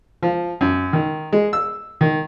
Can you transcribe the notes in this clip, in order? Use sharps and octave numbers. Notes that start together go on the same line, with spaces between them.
F3
F#2
D#3
G#3
E6
D#3